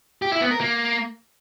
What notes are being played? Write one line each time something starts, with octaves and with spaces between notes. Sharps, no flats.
G4
E4
B3
A#4
A#3